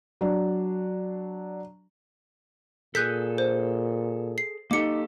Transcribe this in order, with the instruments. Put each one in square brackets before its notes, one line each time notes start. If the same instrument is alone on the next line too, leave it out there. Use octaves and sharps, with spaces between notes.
[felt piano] F#3 D4
[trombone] A#2 [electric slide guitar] G#4 A4 [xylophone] F#6 G6 B6
[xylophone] C5
C7
[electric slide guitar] A#3 G4 A4 [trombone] D#4 [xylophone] D6 C#7